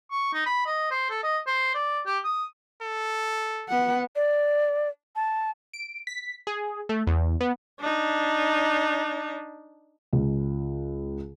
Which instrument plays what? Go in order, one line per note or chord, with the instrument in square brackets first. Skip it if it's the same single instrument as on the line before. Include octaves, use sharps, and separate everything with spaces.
[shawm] C#6
D#4
B5
D#5
C5
A4
D#5
C5
D5
G4
D#6
[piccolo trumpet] A4
[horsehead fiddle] B3 F#5
[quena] D5
A5
[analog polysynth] D7
B6
G#4
A3
E2
B3
[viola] D4 D#4
[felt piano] C#2